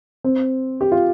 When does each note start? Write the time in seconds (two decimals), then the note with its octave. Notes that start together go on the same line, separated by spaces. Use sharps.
0.24 C4
0.81 G4
0.92 F4